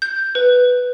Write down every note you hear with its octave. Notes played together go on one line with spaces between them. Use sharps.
G6
B4